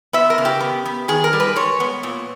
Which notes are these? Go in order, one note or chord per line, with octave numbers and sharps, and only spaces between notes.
B3 E5
A#4
C#3
G4
B3
B3
D#3 G#4
A#4
G3
B4
G#3 C#5
B3
A#2